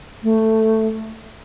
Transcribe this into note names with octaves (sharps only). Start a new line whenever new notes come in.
A3